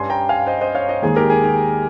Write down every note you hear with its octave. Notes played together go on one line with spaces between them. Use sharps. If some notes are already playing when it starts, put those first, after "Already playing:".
Already playing: G2 G3 C#4 G#5 C6
G5 A#5
F5 G#5
C5 D#5
C5 D#5
C#5 F5
C5 D#5
D#2 D#3 G#3 G#4
G4 A#4
G#4
G4